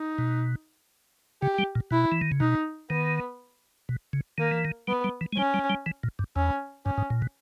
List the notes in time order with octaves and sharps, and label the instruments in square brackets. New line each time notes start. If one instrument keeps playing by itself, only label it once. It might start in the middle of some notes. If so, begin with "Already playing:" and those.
Already playing: [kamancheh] D#4
[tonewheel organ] B2
[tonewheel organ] C#3 [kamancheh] G4
[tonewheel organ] G3
A#2
[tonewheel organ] B2 [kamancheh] E4
[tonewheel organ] E3
D#3
C#3
[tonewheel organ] B2 [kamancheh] D#4
[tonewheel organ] D#3 [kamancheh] B3
[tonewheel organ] B2
C#3
[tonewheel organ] D#3 [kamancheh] A#3
[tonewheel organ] E3
D#3
[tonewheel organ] G3 [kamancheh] B3
[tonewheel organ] G3
E3
G#3
[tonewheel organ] G3 [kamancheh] C#4
[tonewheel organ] G3
G3
E3
A#2
G2
[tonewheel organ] E2 [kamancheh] C#4
[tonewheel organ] G2 [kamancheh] C#4
[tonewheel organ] G#2
A#2
B2